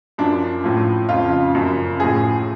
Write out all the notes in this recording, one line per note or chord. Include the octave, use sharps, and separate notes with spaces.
F#2 F3 D4
A2 F3
F2 C#3 F3 F4
F#2 C#3 F3
A2 F3 G#4